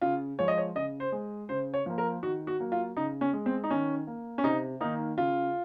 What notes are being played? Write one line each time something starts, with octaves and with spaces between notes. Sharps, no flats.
C#3 F4
F3 G#3 C#5
D#5
C#5
C#3 D#5
C5
G#3
C#3 C5
C#5
F3 A#3
A#4
D#3 F#4
F#4
F#3 A#3
F4
C#3 D#4
C#4
G#3
C4
D#4
D#3 C#4
A#3
C#4
C3 D#4
D#3 A#3 D#4
C#3 F4